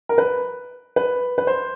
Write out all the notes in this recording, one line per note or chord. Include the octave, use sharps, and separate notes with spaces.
A#4
B4
B4
B4
C5